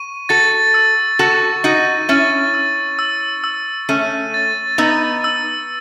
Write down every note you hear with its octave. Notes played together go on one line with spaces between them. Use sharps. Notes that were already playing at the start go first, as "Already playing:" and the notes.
Already playing: C#6 D#7
F#4 A4 A6
E6
F#4 A4 C#6
D#4 F#4 D#7
C#4 E4 A6
E6
E6
E6
A3 C#4 D#7
A6
B3 D#4 E6
E6